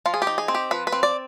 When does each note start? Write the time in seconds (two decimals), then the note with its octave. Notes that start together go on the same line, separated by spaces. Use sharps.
0.06 F3 F4
0.14 G#4
0.22 G4
0.27 D#4
0.38 G#4
0.48 C4
0.55 G4
0.71 F3 B4
0.87 B4
0.92 C4
1.03 D5